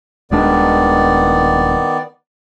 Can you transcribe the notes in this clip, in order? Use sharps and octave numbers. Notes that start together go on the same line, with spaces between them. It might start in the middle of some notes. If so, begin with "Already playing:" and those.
D#1 D#3 G#3 B3 D4 D5